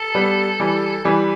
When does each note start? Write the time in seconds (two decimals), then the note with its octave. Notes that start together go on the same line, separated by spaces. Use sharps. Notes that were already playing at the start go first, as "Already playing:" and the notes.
Already playing: A4
0.15 G3 B3
0.60 E3 G3
1.05 E3 G3 B4